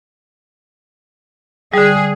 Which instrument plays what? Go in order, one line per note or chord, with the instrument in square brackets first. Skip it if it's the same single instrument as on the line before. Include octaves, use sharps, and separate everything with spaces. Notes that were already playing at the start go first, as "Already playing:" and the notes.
[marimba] D3 G3 [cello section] G#4